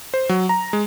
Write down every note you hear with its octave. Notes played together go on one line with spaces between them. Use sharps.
C5
F#3
A#5
G#3